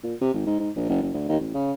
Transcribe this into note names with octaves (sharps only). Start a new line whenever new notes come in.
A#2
C3
G#1
G#2
G#2
A#1
F#1
F#1
D2
D#2
A1
C#3